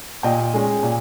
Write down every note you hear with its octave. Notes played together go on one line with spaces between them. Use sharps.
A#2 D#5 G5
G#3 C#4
A#2